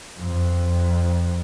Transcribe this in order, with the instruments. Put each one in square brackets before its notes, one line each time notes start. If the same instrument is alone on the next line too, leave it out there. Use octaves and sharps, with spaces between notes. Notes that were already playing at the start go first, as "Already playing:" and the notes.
[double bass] F2